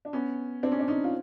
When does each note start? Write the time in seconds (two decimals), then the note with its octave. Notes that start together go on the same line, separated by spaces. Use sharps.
0.05 D4
0.13 B3 C#4
0.63 C4 D4
0.72 C#4
0.80 D4
0.88 C#4 D#4
1.04 F4